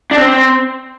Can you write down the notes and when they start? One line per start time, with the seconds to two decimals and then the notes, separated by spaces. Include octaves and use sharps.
0.11 D4
0.17 C4